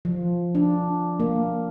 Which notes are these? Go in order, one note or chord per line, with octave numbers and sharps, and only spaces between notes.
F3
D4
A#3